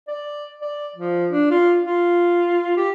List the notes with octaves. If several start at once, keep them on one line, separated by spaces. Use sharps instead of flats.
D5
D5
F3
D4
F4
F4
G4